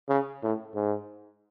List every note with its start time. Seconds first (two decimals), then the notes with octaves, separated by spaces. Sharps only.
0.09 C#3
0.43 A2
0.75 G#2